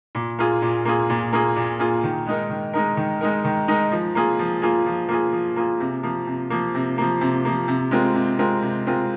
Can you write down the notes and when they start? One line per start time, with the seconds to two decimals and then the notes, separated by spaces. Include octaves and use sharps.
0.15 A#2
0.39 A#3 F4 G#4
0.62 A#2
0.85 A#3 F4 G#4
1.10 A#2
1.33 A#3 F4 G#4
1.56 A#2
1.79 A#3 F4 G#4
2.04 D#3
2.26 G#3 D#4 A#4
2.50 D#3
2.74 G#3 D#4 A#4
2.97 D#3
3.21 G#3 D#4 A#4
3.45 D#3
3.68 G#3 D#4 A#4
3.92 F3
4.15 A#3 F4 G#4
4.39 F3
4.62 A#3 F4 G#4
4.86 F3
5.09 A#3 F4 G#4
5.33 F3
5.56 A#3 F4 G#4
5.80 C3
6.03 F3 A#3
6.27 C3
6.50 F3 A#3
6.75 C3
6.98 F3 A#3
7.21 C3
7.45 F3 A#3
7.68 C3
7.91 G#3 C4 F4 A#4
8.15 C3
8.39 G#3 C4 F4 A#4
8.62 C3
8.86 G#3 C4 F4 A#4